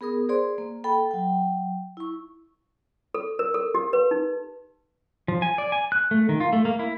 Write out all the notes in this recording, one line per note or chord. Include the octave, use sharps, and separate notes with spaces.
B3 G#4 A#4 D#6
G#4 C5 D5 C6
A#3
A4 G5 B5
F#3 G5
E4 C#6
A4
A#4
A4
G4
B4
D#4
F3
G#5
D5
G#5
F#6
A3
D#3
F4
A3
A#3
E4